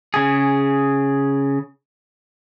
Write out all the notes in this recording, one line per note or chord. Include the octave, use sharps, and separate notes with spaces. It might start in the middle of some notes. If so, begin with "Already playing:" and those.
C#3 G#4